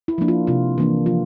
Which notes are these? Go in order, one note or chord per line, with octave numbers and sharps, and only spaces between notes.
E4
F3 A#3 D4
F4
C3 F4
E3 A#3 D4
F3 F4